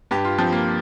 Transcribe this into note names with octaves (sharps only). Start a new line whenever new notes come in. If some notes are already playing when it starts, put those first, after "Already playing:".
G2 G4
F4
F3 C4
A#3